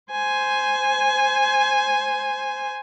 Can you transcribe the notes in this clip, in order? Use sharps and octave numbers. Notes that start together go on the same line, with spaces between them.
C5 G#5